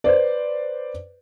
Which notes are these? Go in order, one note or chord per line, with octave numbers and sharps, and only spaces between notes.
B4 C5 D5